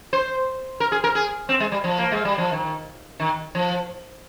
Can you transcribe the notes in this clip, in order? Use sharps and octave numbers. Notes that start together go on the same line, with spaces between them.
C5
A#4
G#4
A#4
G#4
C4
G#3
G3
F3
A#3
G#3
G3
F3
D#3
D#3
F3